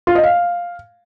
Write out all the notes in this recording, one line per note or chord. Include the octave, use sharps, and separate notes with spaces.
F4
D#5
F5